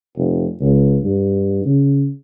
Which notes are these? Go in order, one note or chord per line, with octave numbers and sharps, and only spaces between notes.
F1
C#2
G2
C#3